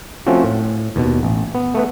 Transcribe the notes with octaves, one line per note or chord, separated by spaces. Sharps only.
F3 A3 C4 C#4 F4 F#4
A2
D#2 B2
A1
B3
A3 B3 B4